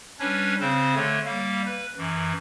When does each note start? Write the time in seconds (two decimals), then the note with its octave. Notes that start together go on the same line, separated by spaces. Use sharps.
0.19 G3 C#4 D4 B4 C#5
0.60 C#3 C4 C5
0.95 D3 A3 C#5
1.25 G3 A#3 F5
1.66 B4
1.97 F#2 E3